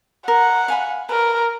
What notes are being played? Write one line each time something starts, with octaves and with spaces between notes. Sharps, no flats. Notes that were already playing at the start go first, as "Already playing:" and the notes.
A#4 F#5
F5 G#5 B5
A#4 B4